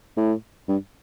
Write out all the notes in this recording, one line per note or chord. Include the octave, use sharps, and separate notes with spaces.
A2
G2